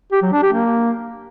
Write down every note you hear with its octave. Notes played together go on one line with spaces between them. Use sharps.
G4
F#3
D4
G4
A#3